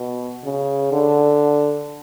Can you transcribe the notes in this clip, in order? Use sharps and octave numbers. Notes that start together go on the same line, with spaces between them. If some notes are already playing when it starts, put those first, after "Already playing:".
Already playing: B2
C#3
D3